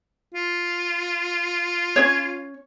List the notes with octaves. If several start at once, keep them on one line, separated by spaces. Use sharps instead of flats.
F4
C#4 D4 C#5